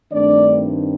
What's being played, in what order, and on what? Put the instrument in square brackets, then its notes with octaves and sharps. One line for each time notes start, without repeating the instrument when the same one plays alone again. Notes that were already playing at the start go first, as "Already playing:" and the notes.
[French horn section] G2 D#3 A3 C4 D4 D5